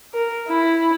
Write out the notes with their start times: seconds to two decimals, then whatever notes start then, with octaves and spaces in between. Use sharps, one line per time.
0.13 A#4
0.48 E4